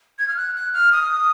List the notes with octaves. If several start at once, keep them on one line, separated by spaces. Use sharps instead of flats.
G#6
F6
F#6
F#6
F6
D#6